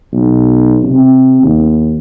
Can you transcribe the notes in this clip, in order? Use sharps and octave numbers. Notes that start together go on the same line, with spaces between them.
B1
C3
D#2